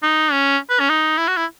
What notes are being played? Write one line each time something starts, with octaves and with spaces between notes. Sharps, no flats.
D#4
C#4
B4
C#4
D#4
E4
F#4
E4